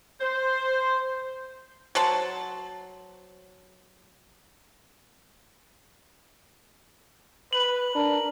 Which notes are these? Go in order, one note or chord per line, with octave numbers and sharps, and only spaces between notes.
C5
F#3 C5 F#5 A5
B4 F#7
D4 A#4